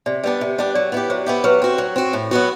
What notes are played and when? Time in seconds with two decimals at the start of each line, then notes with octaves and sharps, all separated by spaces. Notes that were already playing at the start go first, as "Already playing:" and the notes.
0.06 C3 D5
0.24 G3 B3 D4
0.41 C3
0.58 G3 B3 D4
0.75 F#3 D5
0.92 B3 E4 G4
1.10 F#3 C5
1.26 B3 E4 G4
1.44 F#3 B4
1.62 C4 F#4
1.78 F#3
1.96 C4 F#4
2.13 A2
2.31 F#3 B3 F#4